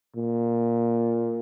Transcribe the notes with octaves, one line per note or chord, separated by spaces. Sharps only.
A#2